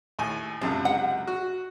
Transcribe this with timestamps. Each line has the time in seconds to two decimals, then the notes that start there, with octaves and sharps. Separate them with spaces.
0.19 D#2 A2 G#5
0.61 C#2 F#2 C3 D4
0.85 F#5
1.27 F#4